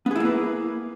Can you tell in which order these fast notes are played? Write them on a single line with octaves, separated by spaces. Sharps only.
B3 G#4 E4 A#3 B4